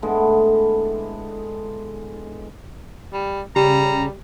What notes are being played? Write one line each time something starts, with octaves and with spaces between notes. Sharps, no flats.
A2 D3 G#3 B3
G3
C#3 G3 G4 A#5